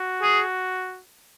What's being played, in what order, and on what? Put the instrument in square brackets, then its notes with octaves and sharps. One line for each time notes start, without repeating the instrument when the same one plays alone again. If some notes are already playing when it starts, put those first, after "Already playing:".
Already playing: [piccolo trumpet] F#4
[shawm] G#4